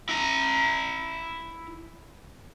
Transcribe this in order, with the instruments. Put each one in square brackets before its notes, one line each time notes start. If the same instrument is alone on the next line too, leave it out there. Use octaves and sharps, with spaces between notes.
[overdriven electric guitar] E4 A#5